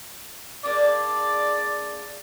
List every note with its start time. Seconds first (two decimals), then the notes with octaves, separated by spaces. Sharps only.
0.64 A#3 D4 G#4 D5